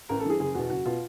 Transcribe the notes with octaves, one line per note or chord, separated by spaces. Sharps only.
A1 A#4
A4
G2 E3 G#4
F#1 G#4
E2 B2 F#4
F#1 F#4
B2 F4